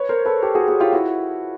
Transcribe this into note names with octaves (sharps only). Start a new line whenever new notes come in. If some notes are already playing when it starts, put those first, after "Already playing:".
Already playing: B4 C#5
A#4 C5
A4 B4
G4 A4
F#4 G#4
F#4 G#4
F4 G4
E4 F#4